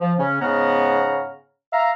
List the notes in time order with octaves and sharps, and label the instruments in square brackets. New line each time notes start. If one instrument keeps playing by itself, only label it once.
[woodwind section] F3
C#3 C#4
G#2 C#3 B3 F#5 A#5 F6
E5 F5 A#5